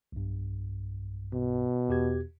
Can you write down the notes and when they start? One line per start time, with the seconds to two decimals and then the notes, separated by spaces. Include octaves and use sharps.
0.12 B1 G2
1.33 B2
1.89 E2 G4 G#6